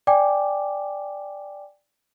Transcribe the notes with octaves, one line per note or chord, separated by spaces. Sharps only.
D5 G5 G#5 D6